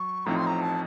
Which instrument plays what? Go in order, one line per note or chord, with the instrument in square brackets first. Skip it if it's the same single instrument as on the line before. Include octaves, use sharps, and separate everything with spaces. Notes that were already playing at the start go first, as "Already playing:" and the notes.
Already playing: [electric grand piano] F#3 [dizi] C#6
[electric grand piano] A1 A2 F3 C4 D#4 [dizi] A#5
[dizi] C6
A#5
A5